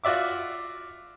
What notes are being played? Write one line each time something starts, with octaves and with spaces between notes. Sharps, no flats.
F4 F#4 D5 E5 D6